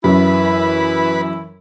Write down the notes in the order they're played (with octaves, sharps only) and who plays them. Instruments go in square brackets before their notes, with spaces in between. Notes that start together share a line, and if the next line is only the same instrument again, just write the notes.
[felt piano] F#2 [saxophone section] E3 E4 [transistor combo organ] B4